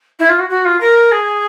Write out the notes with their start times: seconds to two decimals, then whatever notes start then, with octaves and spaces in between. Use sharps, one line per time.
0.19 E4
0.29 F4
0.39 F#4
0.49 F#4
0.65 F4
0.80 A#4
1.11 G#4